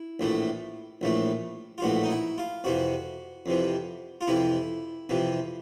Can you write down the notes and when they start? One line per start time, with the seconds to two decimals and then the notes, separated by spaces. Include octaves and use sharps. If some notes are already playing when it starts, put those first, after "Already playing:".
Already playing: E4
0.20 A#1 A2 E3 A3
1.01 A#1 A2 E3 A3
1.78 F4
1.82 A#1 A2 E3 A3 F#4
2.04 D#4
2.10 E4
2.38 F4
2.64 F2 C3 E3 F#4
3.46 F2 C3 E3
4.21 F4
4.27 F2 C3 E3 E4
5.09 F2 C3 E3